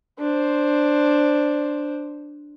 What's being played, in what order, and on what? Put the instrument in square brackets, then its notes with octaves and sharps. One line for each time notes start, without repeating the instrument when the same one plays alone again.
[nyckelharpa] D4 C5